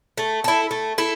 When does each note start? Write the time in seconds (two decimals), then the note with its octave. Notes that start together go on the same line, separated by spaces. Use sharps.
0.18 A3
0.44 E4 A4
0.71 A3
0.98 E4 A4